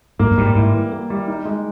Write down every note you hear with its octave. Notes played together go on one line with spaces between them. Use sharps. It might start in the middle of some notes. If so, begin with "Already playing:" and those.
G#2 A#3
G2
G#2 G3
G#2 E4
E3
A#3
G3
D#4
G#3